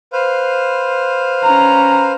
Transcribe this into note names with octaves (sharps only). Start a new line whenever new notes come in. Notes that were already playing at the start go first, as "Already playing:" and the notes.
B4 C5 F5
C#4 A#5